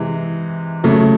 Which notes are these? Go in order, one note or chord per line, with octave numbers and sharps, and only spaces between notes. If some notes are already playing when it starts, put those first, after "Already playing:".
Already playing: C3 E3 G#3
C#3 F#3 A3